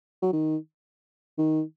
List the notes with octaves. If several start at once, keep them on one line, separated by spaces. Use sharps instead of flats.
F#3
D#3
D#3